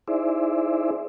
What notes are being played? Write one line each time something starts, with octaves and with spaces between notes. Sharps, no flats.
D#4 E4 G#4 C5 D5 E5